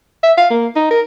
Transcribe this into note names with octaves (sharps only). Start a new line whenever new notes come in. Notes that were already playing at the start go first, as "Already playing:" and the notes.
E5
F5
A#3
D#4
A#4